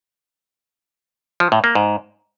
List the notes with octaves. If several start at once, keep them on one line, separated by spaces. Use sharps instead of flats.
F3
A2
A#3
G#2